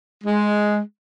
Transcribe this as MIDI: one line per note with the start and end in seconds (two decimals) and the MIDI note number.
0.24 0.79 56